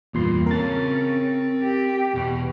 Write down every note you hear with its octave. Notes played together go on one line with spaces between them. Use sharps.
E2 G2 A#2 C6
C#3 C4 C#4 A#4 A5 A6
G4
E2 B2